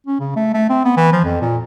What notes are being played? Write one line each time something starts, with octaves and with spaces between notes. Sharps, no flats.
C#4
C#3
A3
A3
C4
B3
E3
F3
F2
A#2